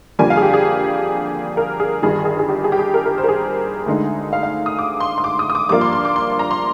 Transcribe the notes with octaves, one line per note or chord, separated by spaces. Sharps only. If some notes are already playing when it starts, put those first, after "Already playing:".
F2 D3 G3 A#3 D4 G#5
F5
G#4
G4
G#4
A#4
G#4
G1 G2 D#3 G#4
G#4
G#4
G4
G#4
G4
G#4
A#4
A#4
C5
A#4
G#4
D2 D3 G#3 D#4
F5
F5
D#6
D6
C6
C6
D6
D#6
D#6
D6
G2 F3 A#3 D4 F4 D6
C6
C6
D6
C6
A#5
C6